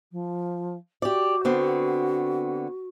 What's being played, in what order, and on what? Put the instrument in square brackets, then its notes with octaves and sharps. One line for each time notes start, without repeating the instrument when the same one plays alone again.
[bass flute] F3
[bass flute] F#4 [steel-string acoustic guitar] G4 D5
[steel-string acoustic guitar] D3 B3 C4